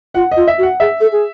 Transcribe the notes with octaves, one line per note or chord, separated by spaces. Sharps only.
F4 F#5
D#5
F4
E5
F#4
F#5
G#4 E5
A4
G#4